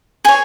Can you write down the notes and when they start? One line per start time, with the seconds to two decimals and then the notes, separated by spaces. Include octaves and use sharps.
0.25 G#4 C#5 G#5